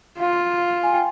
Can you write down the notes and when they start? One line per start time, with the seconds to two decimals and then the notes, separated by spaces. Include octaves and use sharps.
0.19 F4 F5
0.83 G#5
0.93 G5